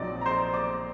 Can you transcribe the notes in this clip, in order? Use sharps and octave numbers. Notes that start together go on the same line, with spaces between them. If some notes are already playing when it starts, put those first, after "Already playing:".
Already playing: A#1 A#2 F#3 C4 D#4 D5 D#5 D6
A#5
C5 C6
D5 D6